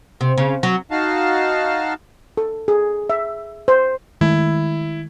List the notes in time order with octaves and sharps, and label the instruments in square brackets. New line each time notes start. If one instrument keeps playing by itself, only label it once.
[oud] C3
C#3
F#3
[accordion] D#4 F#4 F5 A5
[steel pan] A4
G#4
E5
C5
[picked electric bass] D#3 G#3 A3 [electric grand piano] E4